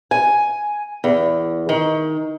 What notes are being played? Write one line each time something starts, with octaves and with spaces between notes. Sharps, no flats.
G#5
E2
D#3